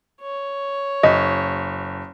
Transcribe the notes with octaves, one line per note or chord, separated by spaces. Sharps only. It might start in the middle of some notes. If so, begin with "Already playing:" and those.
C#5
F#1 D#5